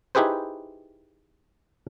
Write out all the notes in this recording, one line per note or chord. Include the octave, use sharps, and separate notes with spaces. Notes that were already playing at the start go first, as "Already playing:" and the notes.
D#4 E4 G4 G#4 B4 C5